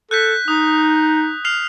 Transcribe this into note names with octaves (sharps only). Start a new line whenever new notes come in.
A4 F#6 G6 B6
D#4 D#6
F6 C7 F7